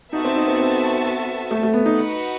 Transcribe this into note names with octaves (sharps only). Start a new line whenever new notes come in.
B3 D#4 F#4 A4 E5 A5
C4
D#4
C4
C4
A3
A3
B3
D#4
D#4 F#4 B4 F#5